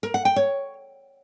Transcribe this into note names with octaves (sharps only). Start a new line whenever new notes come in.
A#4
F#5
G5
C#5